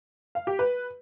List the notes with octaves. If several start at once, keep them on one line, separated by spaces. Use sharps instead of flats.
F5
G4
B4